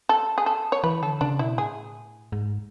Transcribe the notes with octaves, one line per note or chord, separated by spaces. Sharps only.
A4
G#4
A4
C#5
E3 B4
D3 A4
C#3 D4
B2 E4
A2 G#4
G#2